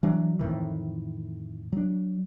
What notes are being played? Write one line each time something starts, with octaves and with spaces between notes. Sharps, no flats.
E3 F#3 D4
F2 A2 D#3 E3
F#3 D4